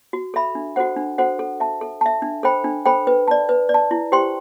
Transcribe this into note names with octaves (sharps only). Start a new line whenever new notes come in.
F#4
A4 E5 B5
D4
F#4 A4 C5 F#5
D4
F#4 A4 C5 F#5
A4
E5 A5
A4
E5 A5
D4
A4 C5 G5 B5
D4
A4 C5 G5 B5
B4
D5 A5
B4
D5
A5
E4
G4 C5 G5 C6